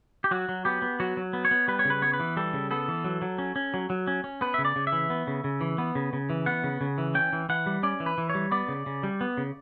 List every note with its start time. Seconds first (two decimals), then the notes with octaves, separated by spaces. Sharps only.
0.24 G4
0.31 F#3 F#4
0.49 F#3
0.65 B3 G4
0.82 B3
1.00 F#3 F#4
1.17 F#3
1.33 B3
1.45 C#5
1.51 B3
1.68 G3 B4
1.79 C#5
1.85 C#3
1.90 B4
2.02 B3 C#5
2.13 B4
2.19 E3
2.37 G3 A4
2.53 C#3
2.71 B3 A4
2.88 E3
3.04 F#3
3.22 F#3
3.38 C#4
3.56 C#4
3.74 F#3
3.90 F#3
4.07 C#4
4.24 C#4
4.41 B3 B4
4.54 C#3 E5
4.65 D5
4.76 C#3
4.87 E5
4.93 E3
5.10 B3
5.27 C#3
5.44 C#3
5.61 E3
5.78 B3
5.95 C#3
6.13 C#3
6.30 E3
6.46 B3 F#5
6.64 C#3
6.81 C#3
6.98 E3
7.15 C#4 G5
7.33 E3
7.49 E3 F#5
7.66 G3
7.83 C#4 D5
8.00 E3
8.06 B4
8.18 E3
8.30 C#5
8.35 G3
8.51 B3 D5
8.68 C#3
8.86 C#3
9.03 G3
9.21 B3
9.37 C#3